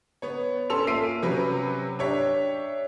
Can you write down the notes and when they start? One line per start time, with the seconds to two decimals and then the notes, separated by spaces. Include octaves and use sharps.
0.22 B3 C#5
0.70 C#4 A4 C6 E6 F7
0.87 A#3 F4 E5 C7 D7 D#7
1.22 C3 F#3 C#4 B4
1.99 D4 G4 C#5 E5